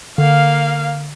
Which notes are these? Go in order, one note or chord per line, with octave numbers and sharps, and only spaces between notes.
D3 A#3 F5